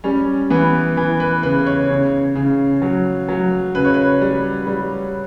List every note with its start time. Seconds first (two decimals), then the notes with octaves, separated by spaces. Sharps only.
0.04 G3 C#4
0.50 E3 B3
0.97 E3
1.20 B4
1.43 C#3 B4
1.66 C#5
1.90 C#3
2.35 C#3
2.82 F#3
3.28 F#3
3.75 C#3 B4
3.85 C#5
3.94 B4
4.21 G3
4.67 G3